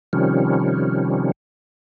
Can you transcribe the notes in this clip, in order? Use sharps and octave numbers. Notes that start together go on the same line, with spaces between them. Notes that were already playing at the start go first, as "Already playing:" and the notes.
C3 D#3 F3 G3 C#4